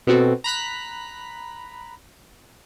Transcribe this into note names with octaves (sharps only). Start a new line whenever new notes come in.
B2 B3 C4 F#4 A4
A#5 B5 F#6 B6